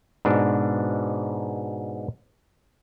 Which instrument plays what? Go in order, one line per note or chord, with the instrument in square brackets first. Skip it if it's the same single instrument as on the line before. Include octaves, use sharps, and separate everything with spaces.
[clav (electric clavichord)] G#2 B2 D4